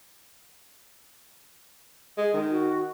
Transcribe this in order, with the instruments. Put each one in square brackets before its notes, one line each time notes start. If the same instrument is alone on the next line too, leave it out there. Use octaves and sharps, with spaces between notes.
[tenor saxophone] G#3
D#3
[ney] F#4